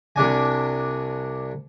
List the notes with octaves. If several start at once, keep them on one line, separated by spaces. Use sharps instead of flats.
C2 C3 D4 G#5